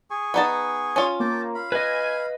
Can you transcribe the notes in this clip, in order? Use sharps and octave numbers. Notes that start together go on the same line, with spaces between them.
G#4 G#5 C#6
B3 D#4 A5
C#4 F4
A#3 G5 A5 D6
F5 B5
B4 D#5 G#5